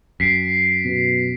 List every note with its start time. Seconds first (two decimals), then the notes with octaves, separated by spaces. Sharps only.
0.20 F#2 B6 C7 D7
0.85 B2